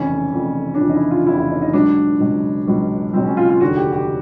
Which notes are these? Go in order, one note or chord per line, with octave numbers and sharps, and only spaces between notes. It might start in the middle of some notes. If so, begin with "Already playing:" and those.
Already playing: F1 F2 C#3 E3 C#4
F1 F2 C#3 E3
D4
F1 F2 C#3 E3 C#4
D#4
E4
F4
F1 F2 C#3 E3 E4
E4
D#4
D#4
C#2 B2 F#3 D4
C#2 B2 F#3
C#2 B2 F#3
C#2 B2 F#3 C4
C#4
F4
F4
F1 D#2 D3 F#4
G4
G4